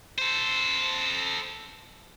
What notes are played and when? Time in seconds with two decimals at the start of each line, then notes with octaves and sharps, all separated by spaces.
0.18 A4 C5